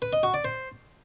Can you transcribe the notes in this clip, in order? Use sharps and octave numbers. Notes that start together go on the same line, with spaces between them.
B4
D#5
F#4
D5
C5